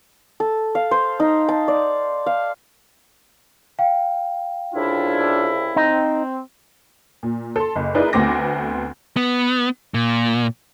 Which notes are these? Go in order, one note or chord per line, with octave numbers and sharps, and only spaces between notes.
A4
F5
C5
D#4
A5
D5
F5
F5 G5
C2 C#3 D4 E4 F4
C4 D#4
A#2
A4 C6
F#1
D#4 E4 G#4 A#4 B4 D5
D2 A3 B3 C4 D6 A#6
B3
A#2